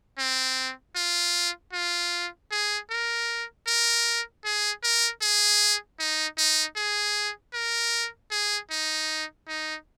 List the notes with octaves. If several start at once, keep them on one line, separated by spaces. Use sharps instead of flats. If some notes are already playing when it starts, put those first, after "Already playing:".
C4
F4
F4
G#4
A#4
A#4
G#4
A#4
G#4
D#4
D#4
G#4
A#4
G#4
D#4
D#4